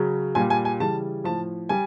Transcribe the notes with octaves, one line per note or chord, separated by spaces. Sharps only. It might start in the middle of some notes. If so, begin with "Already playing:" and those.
Already playing: C#3 F#3
A#2 G3 G#5
G#5
G#5
C#3 E3 G3 A5
A2 F3 A5
G3 G#5